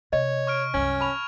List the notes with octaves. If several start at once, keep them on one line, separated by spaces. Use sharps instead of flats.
C3 C#5 D#5
C#6 F6 D7
C2 F#2 C#4 G#6
A5 B5 C#6 F7